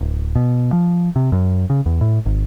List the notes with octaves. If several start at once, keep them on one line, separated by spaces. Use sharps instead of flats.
D1
B2
F3
C3
F#2
C#3
E2
A2
G#1